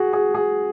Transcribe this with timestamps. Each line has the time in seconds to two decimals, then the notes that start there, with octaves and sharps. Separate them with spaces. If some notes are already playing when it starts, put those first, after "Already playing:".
Already playing: F#4 G#4
0.13 G#4
0.35 G#4